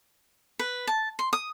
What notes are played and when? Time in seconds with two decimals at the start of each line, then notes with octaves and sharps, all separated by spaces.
0.59 B4
0.87 A5
1.19 C6
1.33 D#6